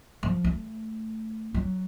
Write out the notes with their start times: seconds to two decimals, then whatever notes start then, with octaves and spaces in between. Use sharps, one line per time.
0.23 F3
0.44 A3
1.54 F#3